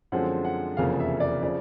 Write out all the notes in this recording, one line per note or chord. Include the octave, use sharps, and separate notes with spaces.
F#2 D3 F3 G#3 C4 F#5
F#5
F1 E2 C#3 F3 A#3 F5
E5
D5
C#3 F3 D5